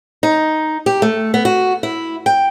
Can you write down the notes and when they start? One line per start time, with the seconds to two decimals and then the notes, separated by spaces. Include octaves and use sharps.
0.23 D#4
0.86 G4
1.02 A3
1.34 B3
1.45 F#4
1.83 E4
2.26 G5